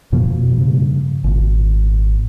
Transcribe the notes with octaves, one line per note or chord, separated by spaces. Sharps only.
F2 B2 F3 A#3
G2 C#3
G#1 A#2